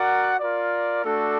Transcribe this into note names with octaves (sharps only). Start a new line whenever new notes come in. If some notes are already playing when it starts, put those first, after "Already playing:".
Already playing: F#4 A#4 D5 F#5
F4 A#4 D5
A3 D4 F#4 A4 D5